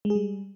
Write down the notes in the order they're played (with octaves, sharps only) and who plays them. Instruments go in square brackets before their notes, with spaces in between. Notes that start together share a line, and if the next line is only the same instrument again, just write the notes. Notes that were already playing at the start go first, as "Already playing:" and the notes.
[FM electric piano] G#3
G#4
G3